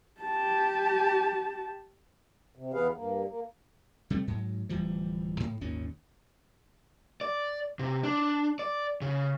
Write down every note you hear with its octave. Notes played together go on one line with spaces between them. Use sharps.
G4 A5
C3
E2 E3 B3 G#4 B4 F5
G2 A#3
A#3
C3 G3 A3
G#2 F#3
D1 E3 F3 G3
G#2
G#1 D#2 A#2 C#4
D5
C3
D4
D5
C#3